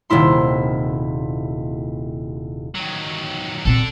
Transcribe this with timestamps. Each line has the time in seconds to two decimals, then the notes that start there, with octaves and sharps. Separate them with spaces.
0.10 D#1 C3 A#3 E4 C6
2.75 D#3 F#3
3.65 A#2 C4 D4 A4